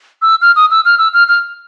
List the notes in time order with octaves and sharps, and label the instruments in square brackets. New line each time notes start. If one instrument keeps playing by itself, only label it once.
[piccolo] E6
F6
D#6
E6
F6
E6
F6
F6